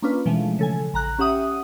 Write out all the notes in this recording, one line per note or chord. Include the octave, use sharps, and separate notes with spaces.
A#3 C#4 D4 F4 B4
B2 E3 F3 G#3 A3
C#3 A4 G#5
A1 A#5 F#6
C#4 G4 E5 F#5 D#6